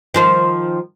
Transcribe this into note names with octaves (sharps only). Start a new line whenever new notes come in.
D#3 F3 C5